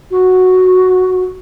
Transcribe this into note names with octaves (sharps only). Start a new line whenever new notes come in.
F#4